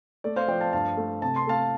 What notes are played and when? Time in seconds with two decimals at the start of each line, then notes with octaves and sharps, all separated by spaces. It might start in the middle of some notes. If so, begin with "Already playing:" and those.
0.24 A3 D5
0.36 C5 F5
0.48 F3 D5 G5
0.61 F5 A5
0.73 G2 F5 A5
0.97 A3
1.22 C3 A5
1.36 C6
1.47 A3 F5 A5